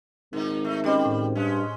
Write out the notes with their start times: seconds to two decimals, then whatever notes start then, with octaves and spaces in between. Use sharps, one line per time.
0.33 G#1 A#2 D#4
0.64 A3 D#4 E4
0.84 G3 C#4 C5 D#5
1.05 A2
1.35 G2 G#3 C#4